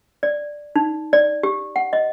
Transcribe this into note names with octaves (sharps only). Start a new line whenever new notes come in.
D5
D#4
D5
G4
F#5
D#5